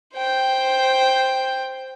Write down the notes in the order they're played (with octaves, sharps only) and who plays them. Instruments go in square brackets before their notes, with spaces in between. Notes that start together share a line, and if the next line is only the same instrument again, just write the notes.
[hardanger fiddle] C5 G5